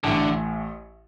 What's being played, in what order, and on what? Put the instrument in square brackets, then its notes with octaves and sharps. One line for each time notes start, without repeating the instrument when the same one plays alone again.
[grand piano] A1 A2 A3 [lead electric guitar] D3